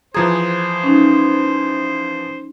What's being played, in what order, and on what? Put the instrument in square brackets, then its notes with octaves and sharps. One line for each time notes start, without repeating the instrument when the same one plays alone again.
[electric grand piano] E3 F3 G#4 [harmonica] C5 [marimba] A#5 D#6 G#6
[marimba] C#4 D#4